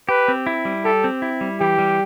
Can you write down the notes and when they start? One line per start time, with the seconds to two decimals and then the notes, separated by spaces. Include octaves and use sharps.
0.09 G4 B4
0.28 C4
0.47 E4
0.65 G3
0.85 G4 A4
1.04 C4
1.22 E4
1.41 G3
1.60 E3 G4
1.79 G3